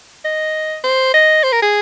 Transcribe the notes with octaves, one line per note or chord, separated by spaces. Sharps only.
D#5
C5
D#5
C5
A#4
G#4